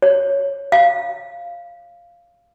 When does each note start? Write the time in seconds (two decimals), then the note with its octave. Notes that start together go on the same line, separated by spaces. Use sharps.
0.02 C#5
0.72 F5